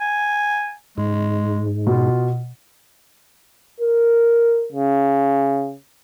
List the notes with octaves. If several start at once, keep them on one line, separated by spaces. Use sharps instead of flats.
G#5
G#2 G#3
B2 F4
A#4
C#3